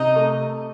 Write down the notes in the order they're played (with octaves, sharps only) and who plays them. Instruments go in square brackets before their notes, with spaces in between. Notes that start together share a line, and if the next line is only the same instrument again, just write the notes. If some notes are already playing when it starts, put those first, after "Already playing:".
Already playing: [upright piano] C3 [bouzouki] D#4
[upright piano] A3